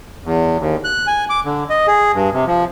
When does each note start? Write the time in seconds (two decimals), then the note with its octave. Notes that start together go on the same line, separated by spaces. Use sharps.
0.24 E2
0.60 D#2
0.84 F#6
1.07 G#5
1.30 D6
1.45 D3
1.70 D#5
1.88 G#4
2.14 G2
2.33 C3
2.46 F3